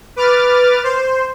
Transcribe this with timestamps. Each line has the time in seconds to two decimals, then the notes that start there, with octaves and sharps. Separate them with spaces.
0.16 B4 D6 F6 A6
0.84 C5